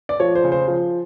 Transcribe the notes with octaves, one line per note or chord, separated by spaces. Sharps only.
D5
F3 C#5
C5
C#3
C5
F3